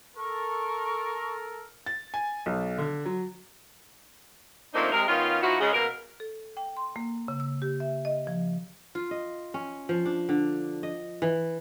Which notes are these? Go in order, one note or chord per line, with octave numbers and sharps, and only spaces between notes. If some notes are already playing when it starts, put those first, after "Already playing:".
A4 A#4 C#6
A6
G#5
B1
D3
F#3
F3 A3 A#3 C4 D4 D#4
C3 G#3 A#4
D#3 B3 C#4 F4
F3 D#4 E4 F#4
C#3 G#3
B2 A#3 A#4
A4
G5
C6
A#3
C#3
E6
G4
E5
D#5
F3
F4
D#5
C#4
F3
D4
D3
D#5
E3